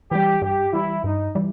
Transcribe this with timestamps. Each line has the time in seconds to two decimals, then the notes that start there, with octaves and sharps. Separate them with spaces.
0.11 E3 G3 G4
0.42 G2 G4
0.73 E3 G3 E4
1.04 G2 D#4
1.35 E3 G3